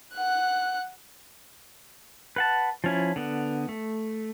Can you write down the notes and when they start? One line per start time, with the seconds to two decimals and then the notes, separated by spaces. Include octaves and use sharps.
0.14 F#5 F#6
2.36 B4 F#5 A5
2.84 F3 C#4 E4
3.16 D3 B3
3.69 A3